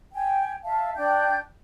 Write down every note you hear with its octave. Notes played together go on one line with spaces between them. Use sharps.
G5 G#5
E5 F5 A5
D4 G5 G6